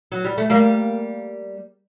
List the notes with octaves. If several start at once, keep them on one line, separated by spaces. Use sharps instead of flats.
F#3
G3
A3
G3 A#3